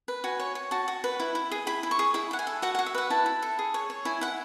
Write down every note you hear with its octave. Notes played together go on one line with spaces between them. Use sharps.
B4
F#4 G#5
C#5
C#5
F#4 A5
F#4
B4
E4
E4
G#4
E4 B5
E4
C#6
G#4
E4 B5
E4 F#5
G#5
A4
F#4 F#5
F#5
F#4
E5
B4 F#5
E4 A5
E4
A4
G#4
C#5
C#5
E4 G#5
E4 F#5